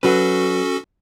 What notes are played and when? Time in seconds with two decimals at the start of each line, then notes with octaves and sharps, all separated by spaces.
0.03 F#3 C#4 F#4 A4 B4